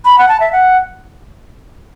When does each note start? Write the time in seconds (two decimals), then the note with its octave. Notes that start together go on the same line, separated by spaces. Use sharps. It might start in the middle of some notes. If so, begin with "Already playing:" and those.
0.05 B5
0.18 F#5
0.29 A5
0.40 E5
0.53 F#5